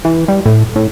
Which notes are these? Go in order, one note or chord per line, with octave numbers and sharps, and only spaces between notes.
E3
G3
A2
A2